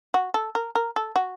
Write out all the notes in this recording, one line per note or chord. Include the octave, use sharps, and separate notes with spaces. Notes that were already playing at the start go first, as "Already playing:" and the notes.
F#4
A4
A#4
A#4
A4
F#4